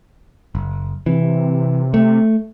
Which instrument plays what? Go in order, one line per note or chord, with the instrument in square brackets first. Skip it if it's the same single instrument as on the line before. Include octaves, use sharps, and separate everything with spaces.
[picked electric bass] F#1
[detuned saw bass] C3 [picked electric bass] E3
[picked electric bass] A3